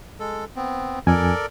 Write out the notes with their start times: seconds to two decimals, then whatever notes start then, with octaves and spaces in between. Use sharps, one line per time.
0.20 G#3 A4
0.56 B3 C4
1.07 F2 A4 A#4 D5 G#5